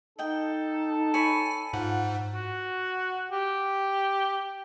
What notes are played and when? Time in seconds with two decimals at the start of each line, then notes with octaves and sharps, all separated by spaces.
0.19 D#4 A4 D#5 G5
1.14 C#5 G#5 B5
1.73 G#2 F4 F#5
2.34 F#4
3.32 G4